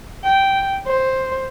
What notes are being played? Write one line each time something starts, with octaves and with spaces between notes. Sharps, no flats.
G5
C5